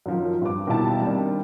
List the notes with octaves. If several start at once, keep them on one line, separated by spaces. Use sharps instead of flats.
F#2 D#3 F3
G2 D6
D#2 B2 G3 E4 A5
D#3 G3 A#3 C4 D4